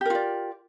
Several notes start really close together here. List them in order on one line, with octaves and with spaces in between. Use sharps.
G4 A#4 F4 D5